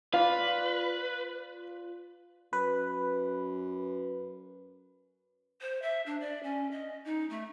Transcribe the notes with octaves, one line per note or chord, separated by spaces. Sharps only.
F4 B4 D5 F5 D6
F#2 B4
C5
E5
D4
D5
C#4
D#5
D#4
A3